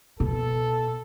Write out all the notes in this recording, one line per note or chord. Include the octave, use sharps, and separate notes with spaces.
B2 A4